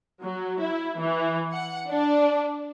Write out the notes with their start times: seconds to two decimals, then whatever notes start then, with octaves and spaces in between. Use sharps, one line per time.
0.23 F#3
0.60 E4
0.98 E3
1.53 F#5
1.89 D4